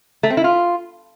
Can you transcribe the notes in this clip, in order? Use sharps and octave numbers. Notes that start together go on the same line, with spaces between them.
A3
C4
E4
F4